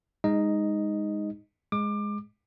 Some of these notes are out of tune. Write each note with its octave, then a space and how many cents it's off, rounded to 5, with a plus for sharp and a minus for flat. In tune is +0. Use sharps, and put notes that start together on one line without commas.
G#3 -20 D#4 +0 D#5 +0
G#3 +0 D6 +25